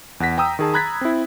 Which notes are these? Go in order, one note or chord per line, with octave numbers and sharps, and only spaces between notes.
E2 F#5 A#6 B6
G5 A#5 D#6 E6
D#3 G#4 A5
A#5 B5 F#6 G#6 A6 B6
C4 E4